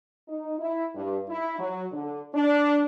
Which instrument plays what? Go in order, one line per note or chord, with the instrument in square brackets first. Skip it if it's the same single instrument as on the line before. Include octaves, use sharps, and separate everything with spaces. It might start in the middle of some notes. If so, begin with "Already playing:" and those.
[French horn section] D#4
E4
G2
E4
F#3
D3
D4